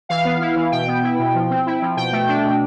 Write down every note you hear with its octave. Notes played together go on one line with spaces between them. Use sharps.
E3 F5
B3
E4
E3
B2 G5
B3
E4
B2
F3
C4
E4
F3
B2 G5
A3
D4
B2